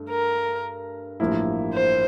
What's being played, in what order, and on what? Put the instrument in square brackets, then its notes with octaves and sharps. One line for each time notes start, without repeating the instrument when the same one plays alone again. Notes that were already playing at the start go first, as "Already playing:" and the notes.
Already playing: [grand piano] G2 A3 D4
[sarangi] A#4
[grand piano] A1 G2 F3 A#3 E4
[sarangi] C5